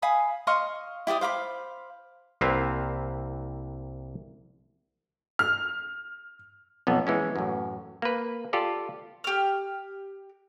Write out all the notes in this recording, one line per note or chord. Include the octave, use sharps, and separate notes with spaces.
F5 G#5 B5 D#6
D#5 F5 C6 C#6
E4 G4 D5 D#6
C5 F5 B5 D6
C2 A#3 C4 B4 E5 F5
F6
B1 F2 B3
E3 G#3 C#4
A1 F#2
A#3 B4
F4 G4 A4 D5
G4 F6